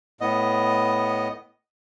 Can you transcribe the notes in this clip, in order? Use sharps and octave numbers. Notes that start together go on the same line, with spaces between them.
A2 B3 D#5